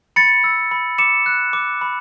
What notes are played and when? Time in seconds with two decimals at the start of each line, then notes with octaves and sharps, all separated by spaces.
0.16 B5 A6 C#7
0.44 E6
0.71 B5
0.98 D6 C#7 E7
1.26 F#6
1.53 D6
1.81 B5